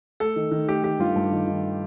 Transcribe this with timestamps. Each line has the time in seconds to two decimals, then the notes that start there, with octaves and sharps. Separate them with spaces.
0.20 A3 A4
0.36 D#3
0.51 D#3
0.68 A3 G4
0.83 D#3 G4
0.99 G2 F4
1.16 G2
1.32 D#3
1.47 D#3